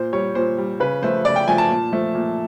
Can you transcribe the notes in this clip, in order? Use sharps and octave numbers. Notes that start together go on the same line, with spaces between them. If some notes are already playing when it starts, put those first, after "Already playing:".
Already playing: A#2 C5
G3 C#5
A#2 C5
G3
C#3 B4
F3 A3 C5
C#3 D5
G5
F3 A3 G#5
A5
A#2
F3 A3
A#2